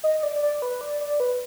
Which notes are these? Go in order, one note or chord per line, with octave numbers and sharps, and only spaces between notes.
D#5
D5
D5
B4
D5
D5
B4